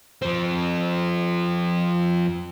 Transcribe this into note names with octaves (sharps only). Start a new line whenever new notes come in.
F3 C4